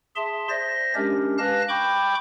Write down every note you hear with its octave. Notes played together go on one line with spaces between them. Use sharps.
G#4 E5 A5 C6
C5 D5 E5 A#6
G#3 C#4 D4 G4 A#4
B4 F5 A5 F#6 A#6
G5 B5 C#6 D6 G6